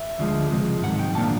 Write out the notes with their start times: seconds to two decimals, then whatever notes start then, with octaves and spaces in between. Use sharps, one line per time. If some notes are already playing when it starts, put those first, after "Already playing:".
Already playing: E5
0.18 D2 D3 F3 G#3
0.50 C#2 C3 F3 G#3
0.82 G#2 D#3 F#3 F#5
0.99 G5
1.15 A#2 F3 A#3 D4 A5